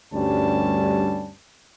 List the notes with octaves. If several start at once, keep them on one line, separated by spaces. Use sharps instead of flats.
D2 G2 G3 C#4 A5